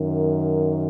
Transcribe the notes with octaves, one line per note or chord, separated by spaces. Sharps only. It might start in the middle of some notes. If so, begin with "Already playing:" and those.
Already playing: F#2 D#3